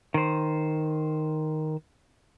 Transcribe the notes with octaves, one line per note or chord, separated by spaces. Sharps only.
D#3 C5